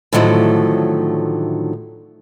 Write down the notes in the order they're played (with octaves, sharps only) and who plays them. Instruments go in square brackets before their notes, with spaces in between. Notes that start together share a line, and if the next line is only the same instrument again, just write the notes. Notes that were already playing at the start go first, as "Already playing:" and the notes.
[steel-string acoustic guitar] A2 D3 D#3 F3 F#3 A3